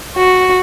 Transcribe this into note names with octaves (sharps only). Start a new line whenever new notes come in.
F#4